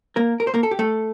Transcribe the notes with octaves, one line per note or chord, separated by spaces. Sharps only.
A#3 A#4
A#4
C5
A#3 A#4
A4
G4
A3 A4